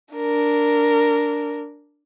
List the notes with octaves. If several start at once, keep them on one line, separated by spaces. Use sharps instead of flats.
D4 A#4